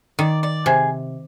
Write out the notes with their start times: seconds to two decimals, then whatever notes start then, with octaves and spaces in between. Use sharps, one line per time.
0.19 D#3 D5
0.43 D5
0.66 C3 G#4